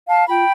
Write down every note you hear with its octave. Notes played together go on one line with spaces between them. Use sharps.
F5 A5
F4 G5 B5